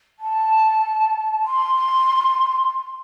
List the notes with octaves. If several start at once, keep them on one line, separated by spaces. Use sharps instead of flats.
A5
C6